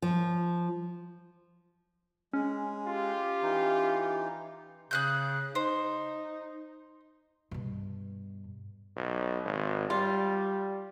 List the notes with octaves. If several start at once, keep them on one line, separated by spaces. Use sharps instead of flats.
F3
G#3 C#4
F4 G4
E3 D#4
C#3 G#4 F#6 G6
D#4 C5
G2 B2
B1
G#1
G3 F4